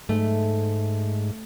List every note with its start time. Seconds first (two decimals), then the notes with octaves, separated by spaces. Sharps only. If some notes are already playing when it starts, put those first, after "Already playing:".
0.09 G#2 A3